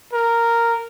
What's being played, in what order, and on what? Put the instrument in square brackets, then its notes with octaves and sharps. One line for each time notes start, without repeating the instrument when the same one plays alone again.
[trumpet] A#4